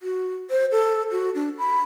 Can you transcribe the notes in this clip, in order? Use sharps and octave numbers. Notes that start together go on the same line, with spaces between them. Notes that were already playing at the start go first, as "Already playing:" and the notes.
F#4
C5
A4
F#4
D4
B5